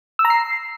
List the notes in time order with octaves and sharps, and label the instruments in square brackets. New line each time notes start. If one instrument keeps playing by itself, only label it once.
[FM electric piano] E6
A#5
C7